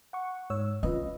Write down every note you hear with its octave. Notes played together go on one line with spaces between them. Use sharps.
F#5 C#6
G#2 C#5 E6
C#4 F4 B4 D#5